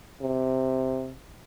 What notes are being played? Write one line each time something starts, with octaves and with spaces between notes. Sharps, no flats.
C3